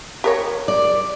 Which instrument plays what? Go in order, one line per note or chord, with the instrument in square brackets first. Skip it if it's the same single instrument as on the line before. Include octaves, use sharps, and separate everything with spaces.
[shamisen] G4 A#4 C#5
[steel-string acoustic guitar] D5